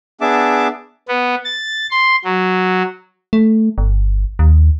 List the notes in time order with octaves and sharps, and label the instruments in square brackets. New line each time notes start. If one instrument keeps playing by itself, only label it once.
[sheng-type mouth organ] B3 D4 G#4 E5 A5 D6
[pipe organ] B3
A6
C6
F#3
[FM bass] A3
G1
D#2